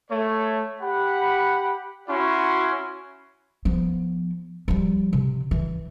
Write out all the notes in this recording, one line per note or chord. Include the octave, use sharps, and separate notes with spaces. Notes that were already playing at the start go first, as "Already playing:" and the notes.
A3 C#5
G4 F#5 B5
C#4 E4 F#4 C#5 B5 C6
F3 B3
F3 G3
C3
E3